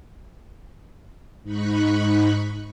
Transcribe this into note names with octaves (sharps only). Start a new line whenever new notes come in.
G#2 D#4 B5 C#6 F#6